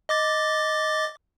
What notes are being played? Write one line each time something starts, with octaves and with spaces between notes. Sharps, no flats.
D#5 D6 A6